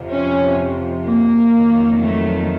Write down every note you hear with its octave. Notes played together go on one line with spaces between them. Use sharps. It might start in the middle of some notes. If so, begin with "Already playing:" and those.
Already playing: F2 C3 F3
C#4
A#3
F2 D#3 F#3
A3